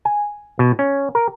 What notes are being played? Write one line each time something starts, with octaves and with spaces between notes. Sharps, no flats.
G#5
B2
C#4
A#4